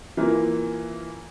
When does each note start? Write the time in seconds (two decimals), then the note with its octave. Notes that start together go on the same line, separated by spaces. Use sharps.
0.17 E3 A#3 F4